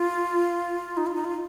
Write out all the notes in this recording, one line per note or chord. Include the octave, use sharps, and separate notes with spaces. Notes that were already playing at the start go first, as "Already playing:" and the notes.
Already playing: F4
D#4
F4
D#4
F4